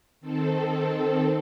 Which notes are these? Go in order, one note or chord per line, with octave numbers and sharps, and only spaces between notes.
D#3 C4 A4